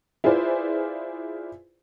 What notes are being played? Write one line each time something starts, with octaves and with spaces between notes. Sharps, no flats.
E4 F4 G#4 B4 C5 D5